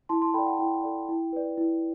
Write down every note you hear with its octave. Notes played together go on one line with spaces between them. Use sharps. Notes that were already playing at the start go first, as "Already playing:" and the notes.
E4 A5 C6
A5 C6
A4 D5 G5 B5
F#5 A5
E4 G5
A4 D5
E4
B4 D5
E4